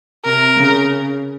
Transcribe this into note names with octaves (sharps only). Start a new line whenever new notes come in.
C3 A#4
C#3